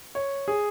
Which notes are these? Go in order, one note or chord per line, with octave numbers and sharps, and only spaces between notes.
C#5
G#4